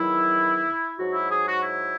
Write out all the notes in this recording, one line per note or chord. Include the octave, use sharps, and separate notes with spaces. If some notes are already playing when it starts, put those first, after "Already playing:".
Already playing: E2 D#3 F#3 E4
G#2 F#3 F#4
E4
G#4
F#4
E4